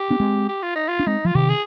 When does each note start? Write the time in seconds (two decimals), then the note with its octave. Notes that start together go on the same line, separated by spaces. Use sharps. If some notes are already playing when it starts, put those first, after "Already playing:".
Already playing: G4
0.11 B3 D4
0.20 G#3 C4
0.49 G4
0.62 F4
0.76 D#4
0.88 F4
0.99 D4
1.07 G#3 C4 D#4
1.25 F3 F4
1.35 C3 D#3 G4
1.49 G#4